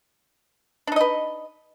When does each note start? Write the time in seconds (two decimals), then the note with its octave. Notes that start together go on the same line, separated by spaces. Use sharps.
0.87 D4
0.92 D#4
0.96 D#5
1.01 B4